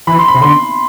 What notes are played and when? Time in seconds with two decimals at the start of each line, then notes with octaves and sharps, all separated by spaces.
0.07 E3 B5
0.18 C6
0.28 B5
0.34 C3
0.42 D3 C6